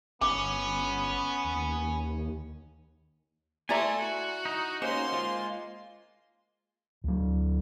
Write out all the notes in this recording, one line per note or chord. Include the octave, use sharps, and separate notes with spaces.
G1 B3 C#4 D6
D#2
A3 E4 D5 G#5 A#5 C6
F#4
D#4
A#3 C#4 D#4 F#4 C5 C6
G#3 F4
D2 F#3